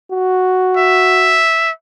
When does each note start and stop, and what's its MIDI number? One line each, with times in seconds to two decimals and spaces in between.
0.12 1.43 66
0.77 1.70 76